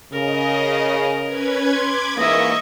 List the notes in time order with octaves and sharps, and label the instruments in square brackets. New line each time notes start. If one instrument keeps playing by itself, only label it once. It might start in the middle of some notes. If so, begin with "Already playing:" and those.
[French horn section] C#3 [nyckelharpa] A#4 [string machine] D#5
[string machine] C#4 B4 G#6
[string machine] B5 D6 G#6 [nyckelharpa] C6
[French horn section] G#2 E3 A#3 [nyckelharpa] D#5 E5 [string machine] C#6